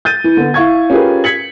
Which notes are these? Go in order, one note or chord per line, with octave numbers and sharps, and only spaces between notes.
G6 A6 D#7
E3
D3 B3
E4 F5 C#6 G#6
C#4 F4 G4 G#4 A#4 B4
G#6 B6 C#7 F#7